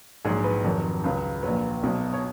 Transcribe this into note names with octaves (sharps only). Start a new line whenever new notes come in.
A#1 G#2 F#3 G#4
B4
F1 F2 D#3 F#3
C#2 C#3 F#3
A#1 A#2 F#3 B4
B1 B2 F#3
C#5